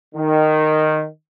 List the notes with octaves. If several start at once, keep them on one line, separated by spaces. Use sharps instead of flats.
D#3